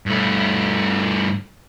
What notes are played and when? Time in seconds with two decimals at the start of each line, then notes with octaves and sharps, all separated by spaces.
0.06 G2 A3